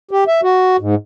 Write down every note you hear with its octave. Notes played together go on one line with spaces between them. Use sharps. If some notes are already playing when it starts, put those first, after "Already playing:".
G4
E5
F#4
G#2